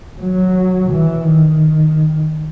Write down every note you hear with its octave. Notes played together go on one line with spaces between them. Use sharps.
F#3
E3
D#3